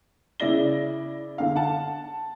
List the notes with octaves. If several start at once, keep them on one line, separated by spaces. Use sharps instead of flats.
C#3 E4 D5 A#6 G7
D3 F5
F#5 A5